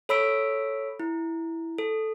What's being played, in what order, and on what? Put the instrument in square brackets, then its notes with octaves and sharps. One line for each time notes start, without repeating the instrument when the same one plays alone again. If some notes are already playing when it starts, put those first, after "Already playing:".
[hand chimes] A4 C#5 B5 E6 B6 D7
E4
A4